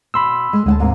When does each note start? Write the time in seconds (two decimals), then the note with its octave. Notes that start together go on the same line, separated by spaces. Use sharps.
0.14 B2 B5 C6 E6
0.53 G#3
0.66 D2 G#3 F#5 A5
0.80 G#2 C3 A#3